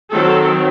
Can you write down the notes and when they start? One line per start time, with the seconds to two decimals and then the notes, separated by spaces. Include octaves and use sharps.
0.11 D#3 F#3 C4 A4